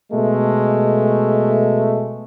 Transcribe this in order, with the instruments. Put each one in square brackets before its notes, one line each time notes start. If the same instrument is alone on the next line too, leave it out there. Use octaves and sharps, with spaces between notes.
[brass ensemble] B2 G#3 A3